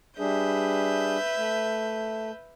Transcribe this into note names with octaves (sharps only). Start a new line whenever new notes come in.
G3 D4 G#4 B4 E5 G6
A3